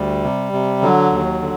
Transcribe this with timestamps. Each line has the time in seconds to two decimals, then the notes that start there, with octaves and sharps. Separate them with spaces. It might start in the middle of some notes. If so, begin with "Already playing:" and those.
Already playing: D2 G3
0.23 C3
0.53 C3
0.82 D3 F#3
1.12 D#2
1.41 D3